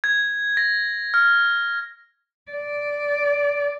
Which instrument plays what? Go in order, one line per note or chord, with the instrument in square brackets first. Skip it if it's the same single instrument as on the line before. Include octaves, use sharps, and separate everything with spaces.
[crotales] G#6
A#6
F6
[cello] D5